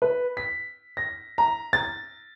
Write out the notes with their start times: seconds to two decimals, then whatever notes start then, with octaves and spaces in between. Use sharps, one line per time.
0.02 B4
0.37 B6
0.97 A#6
1.38 A#5
1.73 A6